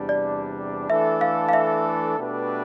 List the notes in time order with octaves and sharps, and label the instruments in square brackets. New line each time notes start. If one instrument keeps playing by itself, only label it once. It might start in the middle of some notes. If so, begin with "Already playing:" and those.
Already playing: [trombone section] E2 C3 G3 D4
[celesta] D5
[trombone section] E3 A3 D4 A4 [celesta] E5
[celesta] F5
F5
E5
[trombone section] B2 A3 D4 G4 B4